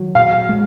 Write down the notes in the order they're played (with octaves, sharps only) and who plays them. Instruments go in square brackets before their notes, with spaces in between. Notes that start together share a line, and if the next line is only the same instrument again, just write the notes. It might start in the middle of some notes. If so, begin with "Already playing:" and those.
Already playing: [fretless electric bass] D#3 F#3
[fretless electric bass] A#2 [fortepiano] F5
[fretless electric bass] G#3